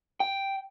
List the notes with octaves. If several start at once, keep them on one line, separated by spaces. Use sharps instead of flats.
G5